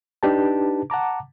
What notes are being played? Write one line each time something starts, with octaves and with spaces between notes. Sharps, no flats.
D4 D#4 G4 B4 A5
F#5 A5 A#5 D6